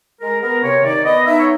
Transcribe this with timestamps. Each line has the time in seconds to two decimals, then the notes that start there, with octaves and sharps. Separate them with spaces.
0.21 G#3 A#4
0.42 B3 A#4
0.63 C3 C#5
0.84 D#3 D5
1.05 B3 D#5
1.25 D#4 E5
1.39 C#5